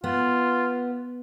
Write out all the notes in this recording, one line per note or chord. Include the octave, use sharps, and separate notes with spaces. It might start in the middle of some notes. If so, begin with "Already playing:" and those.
B3 F4